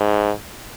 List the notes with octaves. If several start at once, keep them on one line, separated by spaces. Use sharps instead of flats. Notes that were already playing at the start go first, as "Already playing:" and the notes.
Already playing: G#2